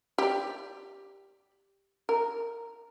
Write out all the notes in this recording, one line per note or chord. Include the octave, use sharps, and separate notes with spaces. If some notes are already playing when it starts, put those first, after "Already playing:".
G4 D5
A#4